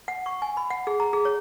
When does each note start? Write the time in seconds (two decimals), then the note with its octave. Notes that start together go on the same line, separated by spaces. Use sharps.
0.08 F#5
0.26 C#6
0.42 G#5
0.57 B5
0.70 F#5
0.87 G#4
1.00 A#5
1.13 G#4
1.25 C#5